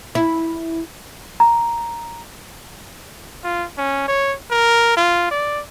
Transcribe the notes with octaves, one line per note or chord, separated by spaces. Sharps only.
E4
A#5
F4
C#4
C#5
A#4
F4
D5